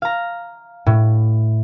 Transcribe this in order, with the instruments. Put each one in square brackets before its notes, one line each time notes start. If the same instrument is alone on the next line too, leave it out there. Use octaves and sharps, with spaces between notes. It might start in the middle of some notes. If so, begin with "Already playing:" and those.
[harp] F5 A#5
A2